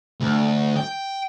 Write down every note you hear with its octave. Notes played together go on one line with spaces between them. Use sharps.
D2
G5